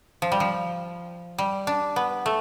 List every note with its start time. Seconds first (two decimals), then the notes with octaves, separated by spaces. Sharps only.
0.22 F3
0.32 G3
0.40 F3
1.38 G3
1.67 D4
1.96 B3
2.26 A3